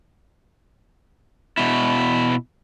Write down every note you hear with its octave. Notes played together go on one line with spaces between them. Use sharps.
B2 E4